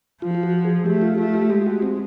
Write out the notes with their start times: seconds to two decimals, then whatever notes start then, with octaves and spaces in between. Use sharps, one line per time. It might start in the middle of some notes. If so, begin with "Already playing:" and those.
0.22 F3 F4
0.35 F4
0.43 F#4
0.65 G#4
0.86 A3 G4
1.02 F4
1.18 A3 F4
1.34 G4
1.50 G#3 G4
1.66 F#4
1.82 C4